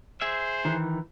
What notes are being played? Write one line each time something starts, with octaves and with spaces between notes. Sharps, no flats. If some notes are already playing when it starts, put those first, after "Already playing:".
G#4 C5 E5
D#3 E3